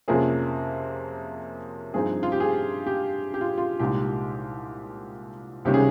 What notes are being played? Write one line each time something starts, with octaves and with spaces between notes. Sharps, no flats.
F2 C3 F3 A#3 C#4 G#4
G2 F3 C4 D#4 G#4
F4
G4
G#4
G4
G4
F4
F4
C2 A#2 G#3 D#4 G4
C#2 C3 D#3 G3 C#4 G4
G#4